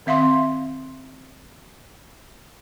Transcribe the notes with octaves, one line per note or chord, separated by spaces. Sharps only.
D#3 C4 E5 F5 C6